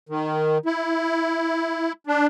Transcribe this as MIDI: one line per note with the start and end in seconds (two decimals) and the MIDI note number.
0.09 0.58 51
0.66 1.92 64
2.07 2.27 62